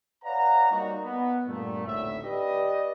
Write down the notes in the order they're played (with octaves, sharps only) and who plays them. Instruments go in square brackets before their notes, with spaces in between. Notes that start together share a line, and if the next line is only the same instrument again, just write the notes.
[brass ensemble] B4 C#5 D5 F5 F#5 A#5
G3 A#3 D#4 F#4
B3
G2 A#2 A3
G#1 D2 A2 E5
G4 B4 D5 D#5